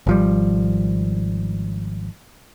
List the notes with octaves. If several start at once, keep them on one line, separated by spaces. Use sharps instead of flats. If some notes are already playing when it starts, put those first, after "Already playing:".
G#1 F3 G3